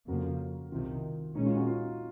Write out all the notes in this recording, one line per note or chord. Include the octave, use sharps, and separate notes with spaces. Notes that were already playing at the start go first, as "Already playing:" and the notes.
F2 C#3 F3 A#3 F#4 A#4
C2 C3 D#3 F4
A#2 G#3 C#4 D#4
F4
D#4 F#4
F4